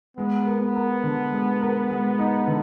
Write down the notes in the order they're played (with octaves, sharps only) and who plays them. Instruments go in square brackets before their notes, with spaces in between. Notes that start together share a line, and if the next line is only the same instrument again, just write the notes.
[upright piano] G#3 [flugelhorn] B3
[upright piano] A#4
[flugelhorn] B3
[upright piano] A#4
D3
G#3
A#4
G#3
D#4
D3